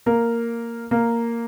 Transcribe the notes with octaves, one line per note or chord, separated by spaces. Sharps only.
A#3 A#4
A#3 A#4